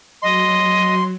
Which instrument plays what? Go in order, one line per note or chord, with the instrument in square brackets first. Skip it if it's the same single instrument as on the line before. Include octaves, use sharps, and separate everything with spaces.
[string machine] F#3 [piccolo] D#5 [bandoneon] C6